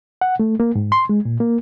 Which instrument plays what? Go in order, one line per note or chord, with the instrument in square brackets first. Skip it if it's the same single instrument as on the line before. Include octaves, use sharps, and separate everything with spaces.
[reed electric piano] F#5
A3
A#3
G#2
C6
G#3
A#2
A#3